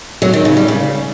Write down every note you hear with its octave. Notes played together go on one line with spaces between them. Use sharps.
F#3
D#3
C#3
G3
C#3